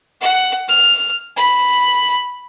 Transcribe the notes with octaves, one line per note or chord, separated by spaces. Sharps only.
F#5
F6
B5